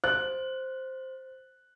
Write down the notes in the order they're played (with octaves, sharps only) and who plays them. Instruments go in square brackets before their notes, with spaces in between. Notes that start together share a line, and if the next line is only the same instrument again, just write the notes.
[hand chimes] C5 [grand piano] F#6